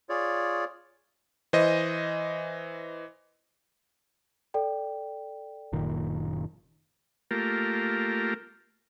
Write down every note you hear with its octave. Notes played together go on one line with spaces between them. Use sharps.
F4 G#4 C#5 D5
E3 C5 D#5
A4 D5 G5
F#1 A#2 D#3
A3 A#3 F4 G4 A#4